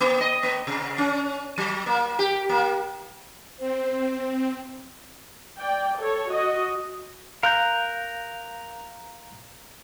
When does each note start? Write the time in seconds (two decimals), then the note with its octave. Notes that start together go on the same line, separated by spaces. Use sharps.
0.01 A#3
0.21 D#5
0.43 A#3
0.67 C3
0.98 C#4
1.58 F#3
1.86 A#3
2.19 G4
2.49 A#3
3.59 C4 C5
5.60 D5 G5
6.01 A4 C#5
6.30 F#4 D#5
7.43 A#4 F5 F#6 G6